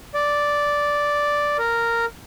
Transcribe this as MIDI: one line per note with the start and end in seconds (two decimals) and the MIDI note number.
0.14 1.57 74
1.59 2.06 70